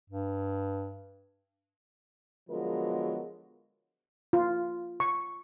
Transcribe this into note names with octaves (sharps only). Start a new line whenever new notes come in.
G2
D3 F3 F#3 G#3 B3 A#4
F4
C#6